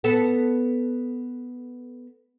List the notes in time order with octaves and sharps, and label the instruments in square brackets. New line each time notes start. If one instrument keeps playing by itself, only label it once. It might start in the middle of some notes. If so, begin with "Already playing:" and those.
[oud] B3 A4